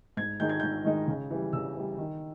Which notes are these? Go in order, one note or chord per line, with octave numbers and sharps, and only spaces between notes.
G#2 G#6
D#3 G#3 D#4 G6
G#6
G#2 G6
D#3 G#3 D#4
C#3
E3 G3
C#3 E6
E3 G3
D#3